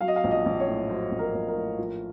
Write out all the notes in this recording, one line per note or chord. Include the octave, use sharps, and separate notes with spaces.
F#3 F5
D#5
F5
A#1
D#5
A#1
C#5
A2
F#3 C5
A#1
A#4
A#1
A#4
A2
F3